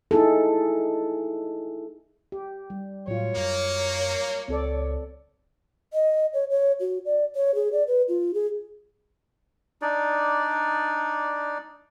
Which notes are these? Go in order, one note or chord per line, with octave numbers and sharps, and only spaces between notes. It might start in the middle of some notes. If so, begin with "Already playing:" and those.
D#4 E4 G#4 A4
G4
G3
A2 F#3 F4 C#5
F#2 A#3
C#2 C4 A4 D5
D#5
C#5
C#5
F#4
D5
C#5
G#4
D5
B4
F4
G#4
D4 D#4 D5